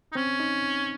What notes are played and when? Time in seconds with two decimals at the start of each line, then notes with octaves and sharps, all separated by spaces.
0.12 D#4
0.15 C4 C#4
0.40 D#4